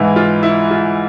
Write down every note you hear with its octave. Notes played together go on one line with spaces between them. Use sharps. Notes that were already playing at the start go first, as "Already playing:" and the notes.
Already playing: G#2 E3 E4
F4
E4
F4